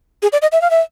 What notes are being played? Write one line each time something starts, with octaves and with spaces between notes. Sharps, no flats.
G#4
D5
D#5
E5
F5
E5